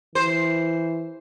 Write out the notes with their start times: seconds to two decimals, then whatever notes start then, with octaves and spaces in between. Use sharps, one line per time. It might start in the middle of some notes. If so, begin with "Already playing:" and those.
0.15 E3 C5